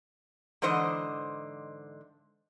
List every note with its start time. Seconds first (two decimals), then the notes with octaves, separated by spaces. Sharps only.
0.62 G#2 D3 E3 C5 D#5